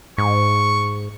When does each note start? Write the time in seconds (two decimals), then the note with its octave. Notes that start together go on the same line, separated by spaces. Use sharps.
0.18 G#2 C#6